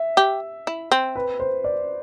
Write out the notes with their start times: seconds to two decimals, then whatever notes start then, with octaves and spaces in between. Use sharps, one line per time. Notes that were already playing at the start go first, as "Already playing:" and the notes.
Already playing: E5
0.17 G4
0.67 E4
0.92 C4
1.16 B4
1.40 C5
1.64 D5